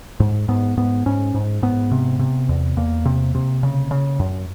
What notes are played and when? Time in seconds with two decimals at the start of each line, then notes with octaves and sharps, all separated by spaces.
0.20 G#2
0.48 G#2 B3
0.77 G#2 B3
1.06 G#2 C#4
1.34 G#2
1.63 G#2 B3
1.91 C3
2.19 C3
2.49 E2
2.77 E2 A#3
3.05 C3
3.35 C3
3.63 C#3
3.91 C#3
4.20 F#2